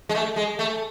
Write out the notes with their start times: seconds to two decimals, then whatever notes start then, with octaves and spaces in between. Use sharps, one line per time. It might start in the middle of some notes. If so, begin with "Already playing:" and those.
0.09 G#3
0.15 A3
0.36 G#3
0.59 A3